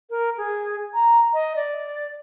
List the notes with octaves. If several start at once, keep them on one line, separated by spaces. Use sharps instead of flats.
A#4
G#4
A#5
D#5
D5